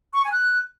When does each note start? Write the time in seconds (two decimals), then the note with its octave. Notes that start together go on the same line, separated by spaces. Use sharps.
0.15 C#6
0.23 G#5
0.32 F#6